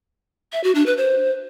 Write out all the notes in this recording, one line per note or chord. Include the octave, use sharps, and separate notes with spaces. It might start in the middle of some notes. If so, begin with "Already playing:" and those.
E5
F#4
D4
B4
C5